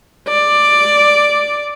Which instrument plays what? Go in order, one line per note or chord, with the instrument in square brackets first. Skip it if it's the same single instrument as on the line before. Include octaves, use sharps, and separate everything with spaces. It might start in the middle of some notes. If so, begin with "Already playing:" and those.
[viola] D5